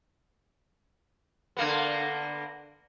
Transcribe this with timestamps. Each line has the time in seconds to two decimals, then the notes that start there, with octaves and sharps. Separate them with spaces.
1.57 D3 A#3 B3